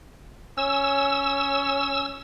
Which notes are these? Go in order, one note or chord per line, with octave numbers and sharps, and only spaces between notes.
C#4 E6